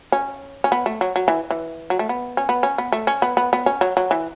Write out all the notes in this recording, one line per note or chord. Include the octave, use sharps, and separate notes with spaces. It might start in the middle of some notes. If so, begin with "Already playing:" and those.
C#4
C#4
B3
A3
F#3
F#3
E3
E3
F#3
A3
B3
C#4
B3
C#4
B3
A3
C#4
B3
B3
B3
C#4
F#3
F#3
E3